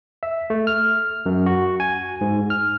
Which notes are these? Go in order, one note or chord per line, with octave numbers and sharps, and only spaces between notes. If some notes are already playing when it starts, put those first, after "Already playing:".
E5
A3
F6
F#2
F#4
G#5
G#2
F6